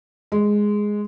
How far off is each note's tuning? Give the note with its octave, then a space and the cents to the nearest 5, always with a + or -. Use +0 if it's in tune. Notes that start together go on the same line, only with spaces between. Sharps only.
G#3 +0